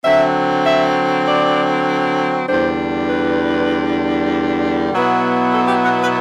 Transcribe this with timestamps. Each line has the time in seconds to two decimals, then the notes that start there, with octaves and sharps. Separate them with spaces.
0.03 D3 F#3 C4 E5
0.64 E5
1.26 D5
2.47 E2 D3 G3 D4 C5
3.09 B4
4.92 B2 F#3 B3 E4
5.53 A4
5.67 G4
5.83 F#4
5.99 B4